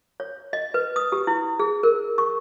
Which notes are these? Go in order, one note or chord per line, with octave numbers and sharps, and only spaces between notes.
C#5
D#5
B4
D#6
G4
E4
G#4
A#4
C#6